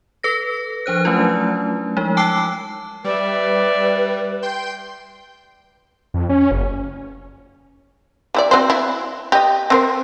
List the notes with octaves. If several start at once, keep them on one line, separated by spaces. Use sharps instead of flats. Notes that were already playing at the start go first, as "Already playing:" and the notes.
A4 B4 A#6
F3 D4 C5 F#6
F#3 A3 C#4 D4 E4 F4
F3 G#3 D#4
G5 A5 D6 E6 F#6 C7
G3 B4 D5 E5
G5 C6 G6
F2
C#4
F#1
G3 E4 D5
C4 F#4 C5
E4
G4 D#5
C4 A#4 C5